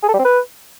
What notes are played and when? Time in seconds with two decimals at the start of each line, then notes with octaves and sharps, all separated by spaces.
0.03 G#4
0.08 A4
0.14 G3
0.19 C4
0.25 B4